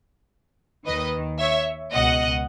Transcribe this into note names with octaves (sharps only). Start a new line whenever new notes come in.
D#2 D#3 B4 D#5
C#5 E5
C#2 B2 D#5 F#5